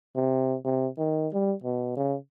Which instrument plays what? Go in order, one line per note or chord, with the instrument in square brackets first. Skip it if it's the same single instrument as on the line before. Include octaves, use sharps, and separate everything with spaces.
[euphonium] C3
C3
D#3
G3
B2
C#3